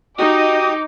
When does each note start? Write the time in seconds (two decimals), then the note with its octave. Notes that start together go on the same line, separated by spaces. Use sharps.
0.19 D#4 F#4 G4 D#5 D6 D#6